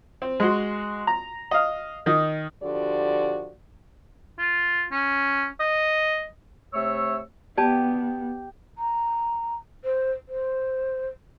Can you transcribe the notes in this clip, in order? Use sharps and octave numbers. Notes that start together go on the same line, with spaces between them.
C4
G#3 F#4 C6
A#5
D#5 F5
D#3 D#4 D#5
D3 F3 F#4 G4 D5
F4
C#4
D#5
C3 A3 C#5 E6
B3 G4 D5 A5
A#5
C5
C5